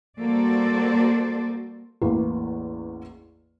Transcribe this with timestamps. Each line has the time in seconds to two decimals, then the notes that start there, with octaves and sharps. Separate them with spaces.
0.19 G3 A#3 F#4 A4 C5 D5
2.02 A1 E2 E3 A#3